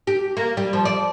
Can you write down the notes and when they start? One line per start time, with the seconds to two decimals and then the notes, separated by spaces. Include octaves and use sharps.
0.07 G4
0.37 A#3
0.57 G3
0.73 F3
0.85 D5